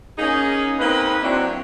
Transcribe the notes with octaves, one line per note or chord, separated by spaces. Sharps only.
A#3 C#4 D#4 G#4
A#3 C4 D#4 B4
F#3 C4 D4 E4 F#4